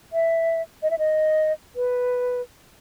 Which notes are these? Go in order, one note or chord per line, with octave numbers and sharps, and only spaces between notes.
E5
D#5
E5
D#5
B4